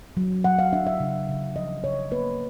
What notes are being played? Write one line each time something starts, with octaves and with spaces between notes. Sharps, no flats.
F#3
F#3 F#5
F5
D4 E5
E5
C#3
C#3
F3 D#5
C#3 C#5
A#3 B4